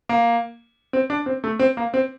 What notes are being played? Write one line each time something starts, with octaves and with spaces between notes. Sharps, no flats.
A#3
C4
D4
C4
A3
C4
A#3
C4